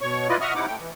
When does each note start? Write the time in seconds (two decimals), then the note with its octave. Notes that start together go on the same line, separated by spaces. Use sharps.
0.01 B2 C#5 C#6
0.29 E4 F4 B4 D5 D#5
0.41 D#5 E5 F#5 C#6 D#6 F6
0.55 C3 D#4 E4 F#5 D6
0.68 A3 G5
0.80 E3